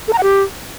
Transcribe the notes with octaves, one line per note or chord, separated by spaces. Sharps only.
A4
A#5
F#5
G4